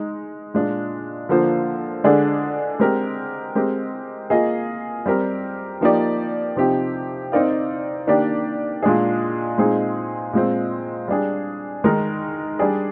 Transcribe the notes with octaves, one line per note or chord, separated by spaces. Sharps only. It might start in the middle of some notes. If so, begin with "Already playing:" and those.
Already playing: G#3 D#4
A#2 G#3 D4
D3 F3 A#3 F4 C5
D3 G#3 D4 G#4 D5
G#3 C4 G4 A#4
G#3 C4 G4 A#4
A#3 F4 G#4 D#5
G3 C4 G4 A#4
F3 A#3 D#4 G4 D5
C3 F3 C4 D#4 G4
C4 D#4 A#4 D5 F5
D#3 A#3 D4 G4 D5
A#2 G#3 D4 G#4
A#2 G#3 C4 D#4 G#4
A#2 G#3 C4
G3 D4 G#4
D#3 G#3 D#4 A#4
G3 D4 G#4 D5